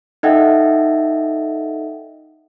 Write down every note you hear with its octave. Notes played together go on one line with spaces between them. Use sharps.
D#4 A4 D#5 E5 F#5 G5